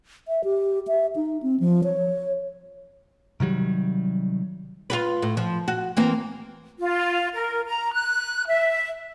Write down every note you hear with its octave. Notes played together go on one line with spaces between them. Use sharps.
E5
G4
E5
D#4
C4
F3
C#5
C3 D#3 F#3 G3
F4 G4 B4
A2
F3
F#4
E3 A#3 C4
F4
A#4
A#5
F#6
E5